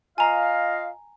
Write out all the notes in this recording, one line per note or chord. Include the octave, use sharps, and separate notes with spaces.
F4 D#5 F5 G#5 A#5